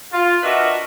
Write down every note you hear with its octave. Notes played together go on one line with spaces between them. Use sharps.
F4
D4 F#4 A#4 B4 D#5 E5